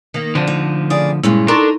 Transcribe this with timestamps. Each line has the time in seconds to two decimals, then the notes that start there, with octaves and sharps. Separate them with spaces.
0.14 D#3 A#3
0.35 D3 F3 C4 D4 D5
0.47 D2 D#4
0.90 C#3 G#4 D5 D#6
1.24 G2 A#2 G#3 C#4 E4
1.48 D4 D#4 A4 A#4 A#5 C6 C#6